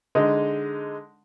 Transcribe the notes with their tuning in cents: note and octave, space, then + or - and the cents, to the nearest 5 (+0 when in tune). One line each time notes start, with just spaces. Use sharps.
D3 +0 G#3 +0 D#4 +0